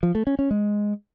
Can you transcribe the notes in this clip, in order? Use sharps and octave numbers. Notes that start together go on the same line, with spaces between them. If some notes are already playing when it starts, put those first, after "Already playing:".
F3
A3
C#4
C#4
G#3